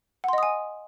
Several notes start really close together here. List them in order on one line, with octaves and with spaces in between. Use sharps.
F#5 C6 D#5 D#6 G#5